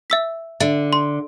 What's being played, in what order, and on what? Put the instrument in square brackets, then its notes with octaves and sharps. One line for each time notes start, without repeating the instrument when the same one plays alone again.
[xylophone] E5 E6 B6
[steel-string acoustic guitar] D3 [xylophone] E5
[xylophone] C6